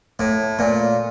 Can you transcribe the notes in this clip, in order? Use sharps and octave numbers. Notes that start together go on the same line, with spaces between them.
A2
A#2